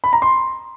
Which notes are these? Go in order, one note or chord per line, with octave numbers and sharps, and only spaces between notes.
B5
A#5
C6